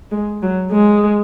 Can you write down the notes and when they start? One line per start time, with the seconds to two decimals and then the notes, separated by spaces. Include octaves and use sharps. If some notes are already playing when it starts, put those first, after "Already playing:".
0.11 G#3
0.42 F#3
0.71 G#3